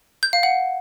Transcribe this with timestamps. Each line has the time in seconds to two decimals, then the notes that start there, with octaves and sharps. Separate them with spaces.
0.23 G6
0.33 F5
0.43 F#5